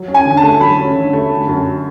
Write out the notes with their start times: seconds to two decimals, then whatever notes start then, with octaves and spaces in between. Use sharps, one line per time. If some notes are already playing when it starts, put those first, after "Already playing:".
Already playing: F#3
0.08 C#4
0.14 G#5
0.26 D3
0.37 A5
0.43 A3
0.60 F#3 B5
0.78 C#4
0.95 D3
1.13 A3
1.30 D3
1.48 F#2